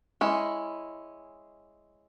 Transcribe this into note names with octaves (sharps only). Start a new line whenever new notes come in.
G#3 C#4 E4